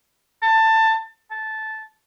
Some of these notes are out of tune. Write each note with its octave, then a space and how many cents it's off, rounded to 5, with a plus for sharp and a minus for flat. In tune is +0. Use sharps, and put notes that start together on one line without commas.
A5 +20
A5 -10